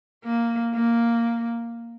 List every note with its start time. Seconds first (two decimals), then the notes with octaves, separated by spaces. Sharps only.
0.25 A#3
0.75 A#3